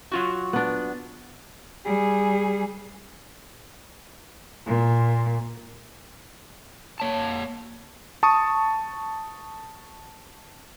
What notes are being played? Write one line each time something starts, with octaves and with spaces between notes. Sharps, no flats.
F#3 F4 F#4
B3 D4
G3 G#4
A#2
A#3 C#5 A5
A5 C#6 D#6